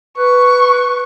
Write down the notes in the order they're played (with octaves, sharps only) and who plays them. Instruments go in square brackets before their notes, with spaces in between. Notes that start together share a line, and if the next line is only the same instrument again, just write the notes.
[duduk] B4 [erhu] C#6